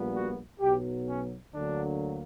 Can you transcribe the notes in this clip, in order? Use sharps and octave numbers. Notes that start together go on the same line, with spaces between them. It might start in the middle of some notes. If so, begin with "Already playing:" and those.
Already playing: A#1 A#2 G3 B3
F#4
B1 B2 F#3 B3 G4
C#4
D2 D3 F#3 A#3 D4